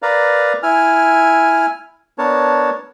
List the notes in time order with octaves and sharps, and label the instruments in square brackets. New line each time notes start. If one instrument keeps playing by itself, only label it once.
[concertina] A#4 B4 D5 F5 A#5
E4 G#5 F6
B3 D4 A#4 C#5 A5